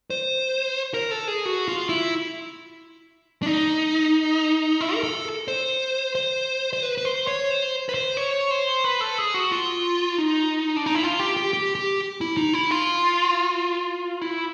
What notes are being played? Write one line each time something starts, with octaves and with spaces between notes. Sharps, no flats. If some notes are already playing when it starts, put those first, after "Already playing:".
C5
A#4
A4
G#4
F#4
F4
E4
D4
D#4
E4
A#4
A4
C5
C5
C5
B4
B4
C5
C#5
C5
B4
C5
C#5
C5
B4
A4
G#4
F#4
F4
D#4
D4
D#4
E4
F4
G4
G4
G4
G4
E4
D#4
E4
F4
E4